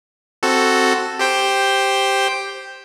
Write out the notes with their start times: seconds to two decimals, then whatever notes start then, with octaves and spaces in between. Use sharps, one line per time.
0.43 C4 F#4 A4
1.19 G4 C5 G5